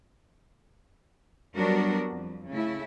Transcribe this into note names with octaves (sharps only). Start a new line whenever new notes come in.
F#3 G3 B3 D4 F#4 A#4
F2
C#3 A3 E4